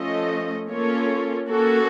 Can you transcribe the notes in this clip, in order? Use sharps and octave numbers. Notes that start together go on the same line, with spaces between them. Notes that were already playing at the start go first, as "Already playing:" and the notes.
Already playing: F3 A3 C#4 A4 D#5
A#3 C#4 F4 A4 C#5
A#3 C#4 F#4 A4